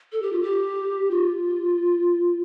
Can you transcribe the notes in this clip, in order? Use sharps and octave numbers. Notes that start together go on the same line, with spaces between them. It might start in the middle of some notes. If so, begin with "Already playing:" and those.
A4
G4
F4
G4
F4